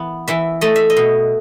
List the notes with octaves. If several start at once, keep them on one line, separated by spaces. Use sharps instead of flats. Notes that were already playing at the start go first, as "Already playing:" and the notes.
Already playing: E3 B3
E3 E5
A3 D#5
E5
D#5
B2